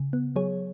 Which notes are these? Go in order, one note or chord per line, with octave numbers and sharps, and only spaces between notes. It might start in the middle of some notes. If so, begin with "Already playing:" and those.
Already playing: C#3
B3
F#3 G#4 C#5